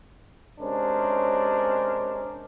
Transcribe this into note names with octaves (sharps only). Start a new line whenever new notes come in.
C3 G#3 C#4 D4 A#4 C5